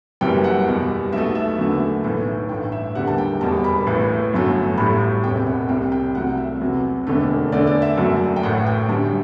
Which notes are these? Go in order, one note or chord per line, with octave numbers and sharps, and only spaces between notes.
F#1 F#2 E3 G3 G5
F#5
E2 B2 G3
B1 B2 A3 E5
E5
F#1 E2 D3 F#3 A3
B1 A2 E3
A1 G2 E3 A3 G5
E5
F#1 E2 D3 G3 F#5
A5
G5
E1 E2 B2 G3 A5
B5
A1 A2 E3
G1 F#2 F#3 A3
A1 A2 G3 B5
E1 E2 C3 G5
F#5
C2 C3 G3 G5
G5
C2 C3 F#3 A3 F#5
E5
E2 C3 F#3
E1 E2 D3 A3
E2 D3 A3 D5
D5
E5
F#1 F#2 F#3 A3
G5
A1 A2 E3 F#5
G5
F#2 D3 G3 A5